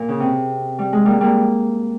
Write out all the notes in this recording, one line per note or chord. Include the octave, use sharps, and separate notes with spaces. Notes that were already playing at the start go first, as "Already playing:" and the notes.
Already playing: A#2
C#3
C3
G3
G#3
G3 A#3
G3 A#3